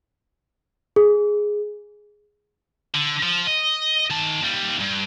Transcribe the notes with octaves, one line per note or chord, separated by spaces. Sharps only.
G#4
D3
F3
D#5
D#3 A5
D#2 G3
G2